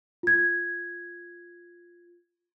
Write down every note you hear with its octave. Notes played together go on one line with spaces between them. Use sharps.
F4 G#6